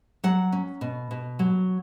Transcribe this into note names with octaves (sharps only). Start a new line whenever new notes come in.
F#3 F#5
C#4
B2
B2
F#3